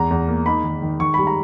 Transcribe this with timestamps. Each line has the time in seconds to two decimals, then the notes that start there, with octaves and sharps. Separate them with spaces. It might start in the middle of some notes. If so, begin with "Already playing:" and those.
Already playing: E2 A#5
0.11 E2
0.28 A#3
0.46 D#4 B5
0.64 D#3
0.82 D#3
1.00 D#3 C#6
1.14 G3 B5
1.27 A#5